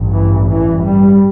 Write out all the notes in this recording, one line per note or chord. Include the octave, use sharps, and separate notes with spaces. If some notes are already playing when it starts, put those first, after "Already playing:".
Already playing: A1 G2
E3
E3
G3